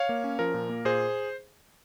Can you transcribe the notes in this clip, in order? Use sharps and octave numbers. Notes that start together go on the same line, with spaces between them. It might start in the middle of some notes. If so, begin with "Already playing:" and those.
Already playing: C#5 F5
A#3
C#4
F3 A#4
A#2
A#3
A#2 G#4 C5